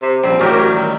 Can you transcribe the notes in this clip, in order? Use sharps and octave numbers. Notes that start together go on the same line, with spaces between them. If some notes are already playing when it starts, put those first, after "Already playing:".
C3
A#1 C#3 G3 C4
A1 F#3 G4 A#4 C#5 D5
D#3 G3